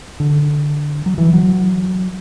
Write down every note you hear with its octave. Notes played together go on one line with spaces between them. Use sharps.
D3
F#3
E3
F#3